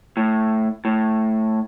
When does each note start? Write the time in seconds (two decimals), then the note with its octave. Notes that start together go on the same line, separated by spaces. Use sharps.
0.17 A2
0.85 A2